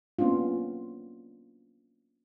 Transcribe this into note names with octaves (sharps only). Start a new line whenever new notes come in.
A#3 B3 C#4 D4 F4